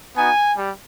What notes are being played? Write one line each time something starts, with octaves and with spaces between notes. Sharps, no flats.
B3 D#4 F#4 G#5
G3